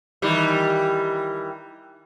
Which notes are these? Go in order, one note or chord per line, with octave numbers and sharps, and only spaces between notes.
D#3 E3 G3